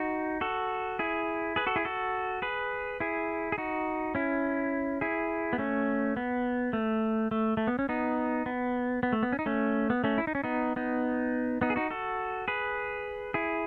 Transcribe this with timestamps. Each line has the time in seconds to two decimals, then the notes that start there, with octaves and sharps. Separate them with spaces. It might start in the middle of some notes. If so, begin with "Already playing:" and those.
Already playing: D#4 F#4
0.41 F#4 A4
0.99 E4 G#4
1.56 G#4 B4
1.67 F#4 A4
1.76 E4 G#4
1.85 F#4 A4
2.42 G#4 B4
3.00 E4 G#4
3.52 G#4
3.58 D#4 F#4
4.15 C#4 E4
5.01 E4 G#4
5.53 B3
5.58 A3 C#4
6.17 B3
6.73 A3
7.31 A3
7.57 A3
7.67 B3
7.79 C#4
7.89 B3 D#4
8.46 B3
9.03 B3
9.13 A3
9.23 B3
9.32 C#4
9.39 D#4
9.46 A3 C#4
9.90 B3
10.04 A3 C#4
10.18 E4
10.27 D#4
10.35 C#4
10.44 B3 D#4
10.76 B3 D#4
11.61 B3 D#4
11.70 G#4
11.76 D#4 F#4
11.90 F#4 A4
12.48 G#4 B4
13.34 E4 G#4